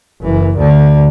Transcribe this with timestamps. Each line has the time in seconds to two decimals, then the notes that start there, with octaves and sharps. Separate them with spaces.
0.21 F#1 E3
0.57 D2 D3